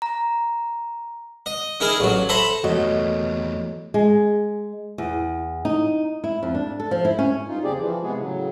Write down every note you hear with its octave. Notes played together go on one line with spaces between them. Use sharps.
A#5
D#5
D#4 E4 G#4 A#4
A1 F#3
A4 C5 E5 A#5 B5
E2 G3 A3 A#3 F#4 C#5 D#5
G#3
E2
D#4
E4
F2
D4
A4
F3
E4
C#4
G2 D#4 F4
D#2 C#3 C4 G4 G#4 D5
E3 F3
C3 E3 G#3 B3 G#4
A2 C#3 F#3